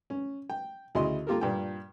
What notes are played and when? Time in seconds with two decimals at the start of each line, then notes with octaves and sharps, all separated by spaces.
0.10 C#4
0.50 G5
0.95 D2 C#3 E4 D#5 C6
1.27 A#3 F4 G4 A4 A#4
1.41 G2 A#2 G5